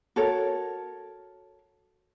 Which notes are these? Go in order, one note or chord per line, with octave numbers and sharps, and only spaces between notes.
F#4 A4 A#4 C#5